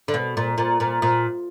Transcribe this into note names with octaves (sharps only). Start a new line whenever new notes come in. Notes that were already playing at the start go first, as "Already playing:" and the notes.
D3
B2
A#2
A#2
A#2
A#2